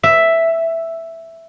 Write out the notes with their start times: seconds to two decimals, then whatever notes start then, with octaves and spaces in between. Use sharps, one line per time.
0.03 E5